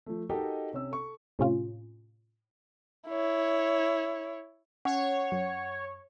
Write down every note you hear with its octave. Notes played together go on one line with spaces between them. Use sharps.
F3 A3
D#4 F#4 G4 A4 A#4 D#5
C3 C#4 E6
A4 C#6
A2 C3 C#4 F4
E4 C#5
C#4 C#5 F#5
F#2